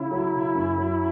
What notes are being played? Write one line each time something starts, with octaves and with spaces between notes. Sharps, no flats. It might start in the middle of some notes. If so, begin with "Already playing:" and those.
Already playing: C#3 E4
F#3
C#3
F#2
F#3